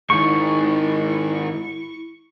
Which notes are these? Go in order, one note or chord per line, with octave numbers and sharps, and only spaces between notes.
G#2 D#3 E4 C#6